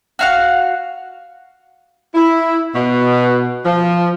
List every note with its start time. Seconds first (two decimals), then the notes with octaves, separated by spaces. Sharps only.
0.19 F#4 F5 F#5
2.15 E4
2.75 B2
3.66 F3